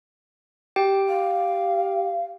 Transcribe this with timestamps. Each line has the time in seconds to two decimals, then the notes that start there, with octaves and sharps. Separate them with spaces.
0.76 G4 G5
1.08 F5